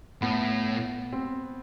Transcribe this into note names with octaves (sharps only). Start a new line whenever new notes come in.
A2 B3
C4